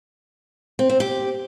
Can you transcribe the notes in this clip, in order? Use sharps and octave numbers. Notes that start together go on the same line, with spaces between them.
C4
C4
G4